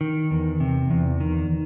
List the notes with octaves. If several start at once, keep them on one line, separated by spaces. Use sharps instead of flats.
D#3
E2
C3
E2
D#3